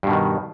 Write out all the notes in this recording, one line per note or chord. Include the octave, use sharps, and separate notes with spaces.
G2 B2 D#3